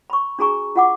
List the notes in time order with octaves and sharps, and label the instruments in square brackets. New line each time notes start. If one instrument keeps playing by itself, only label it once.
[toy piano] B5 C#6
D4 F#4 G#4 A#5 C#6
F4 F#5 D6